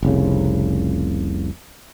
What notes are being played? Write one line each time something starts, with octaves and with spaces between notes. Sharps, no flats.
F1 C2 C#3